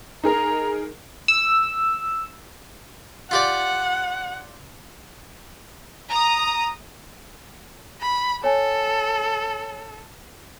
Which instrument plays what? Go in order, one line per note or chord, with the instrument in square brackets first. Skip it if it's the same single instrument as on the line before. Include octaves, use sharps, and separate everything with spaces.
[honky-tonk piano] D#4 G#4 A#4 [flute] A#5
[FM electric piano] E6
[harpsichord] F4 G4 D5 [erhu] F#5
[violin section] A#5 D#6
[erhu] B5
[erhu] A4 [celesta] C#5 G#5